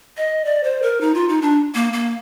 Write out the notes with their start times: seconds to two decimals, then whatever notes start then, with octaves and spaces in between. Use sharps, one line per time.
0.17 D#5
0.45 D5
0.64 C5
0.82 A#4
1.01 D#4
1.14 F4
1.29 D#4
1.42 D4
1.75 A#3
1.93 A#3